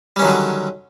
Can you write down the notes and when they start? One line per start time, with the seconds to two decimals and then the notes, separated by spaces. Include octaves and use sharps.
0.16 G3
0.19 C#4
0.22 D#3
0.25 F#3
0.27 D3